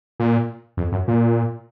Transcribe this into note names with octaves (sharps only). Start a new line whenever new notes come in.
A#2
F2
F#2
A#2